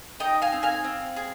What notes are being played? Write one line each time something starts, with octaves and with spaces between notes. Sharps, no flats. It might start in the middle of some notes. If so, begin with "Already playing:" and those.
D#4 D#5 G5
F5 G#5
C4
F5 G#5
C4
G#4